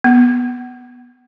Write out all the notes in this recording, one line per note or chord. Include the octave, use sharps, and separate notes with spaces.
B3